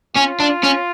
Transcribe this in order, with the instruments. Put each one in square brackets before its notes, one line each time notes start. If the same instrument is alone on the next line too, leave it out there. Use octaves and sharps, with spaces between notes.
[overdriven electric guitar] C#4 [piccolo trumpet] F4
[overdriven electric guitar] D4
C#4